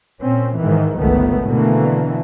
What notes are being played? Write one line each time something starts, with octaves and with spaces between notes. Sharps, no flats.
A#2 C4 C#4
G#2 D#3 E3
G1 C#2 D#3 A3 B3
B2 D3 E3 A3 A#3